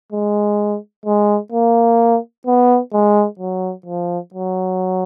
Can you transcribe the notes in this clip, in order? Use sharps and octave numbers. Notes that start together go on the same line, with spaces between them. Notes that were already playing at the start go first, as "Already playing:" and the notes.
G#3
G#3
A#3
B3
G#3
F#3
F3
F#3